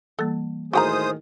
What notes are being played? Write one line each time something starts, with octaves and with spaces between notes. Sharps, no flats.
E3 G3 A#3 A4
A2 D#3 F#4 G#4 C5 G5 A#5 D#6